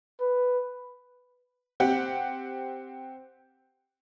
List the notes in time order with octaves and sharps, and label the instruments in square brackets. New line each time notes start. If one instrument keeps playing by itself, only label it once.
[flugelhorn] B4
[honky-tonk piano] C4 G4 F#5